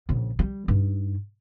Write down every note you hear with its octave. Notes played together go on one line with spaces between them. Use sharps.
A#1 C#3
G3
G2 D#4